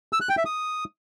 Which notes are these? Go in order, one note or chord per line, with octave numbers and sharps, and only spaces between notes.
E6
F#6
G5
E5
D#6